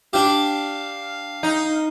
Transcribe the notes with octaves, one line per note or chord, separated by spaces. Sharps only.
D4 G4 F5
D#4